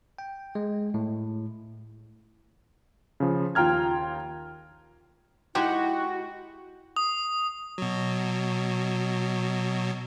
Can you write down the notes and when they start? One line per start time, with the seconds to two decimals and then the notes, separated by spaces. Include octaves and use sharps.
0.18 G5
0.55 G#3
0.94 A2
3.20 C#3 F3
3.55 D#2 F4 G5 A#5 F6 G#6
5.55 G#3 D#4 E4 F#4 G4 G5
6.96 D#6
7.78 B2 F#3